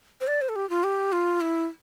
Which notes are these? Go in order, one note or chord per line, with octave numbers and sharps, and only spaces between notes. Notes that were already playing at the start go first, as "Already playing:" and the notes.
C5
D5
C5
A4
G4
F4
G4
F4
E4